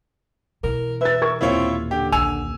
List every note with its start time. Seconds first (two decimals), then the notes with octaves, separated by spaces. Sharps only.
0.63 B2 E3 A#4
1.01 B4 E5 A6
1.22 A#4 C#6 G#6
1.41 D#1 C4 E4 F4 C#5
1.91 D3 G4
2.12 A#1 G#5 E6 F7